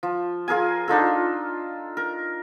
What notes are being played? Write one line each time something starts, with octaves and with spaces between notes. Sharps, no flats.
F3
F4 G#4 A#4 G#5
D4 D#4 F4 A4
A#4